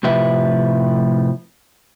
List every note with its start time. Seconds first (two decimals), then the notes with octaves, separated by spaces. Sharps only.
0.03 A2 C3 F3 B4 E5